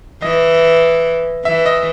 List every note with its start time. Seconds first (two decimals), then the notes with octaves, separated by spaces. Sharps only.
0.22 E3 D#5
1.45 E3 E5
1.66 D#5